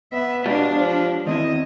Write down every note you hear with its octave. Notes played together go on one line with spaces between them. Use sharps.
B3 E5
B2 G#3 D4 F4 G4
F3
E2 D#3 C4 E4 D#5